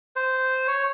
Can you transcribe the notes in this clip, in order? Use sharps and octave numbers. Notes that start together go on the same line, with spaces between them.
C5
C#5